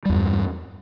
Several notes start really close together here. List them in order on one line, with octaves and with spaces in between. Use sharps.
G3 E2 G2